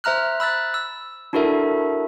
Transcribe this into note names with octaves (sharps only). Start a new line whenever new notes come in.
C5 E5 A#5 F6 F#6
B5 E6 F#6 A6
E6
D4 E4 F#4 A4 A#4 E5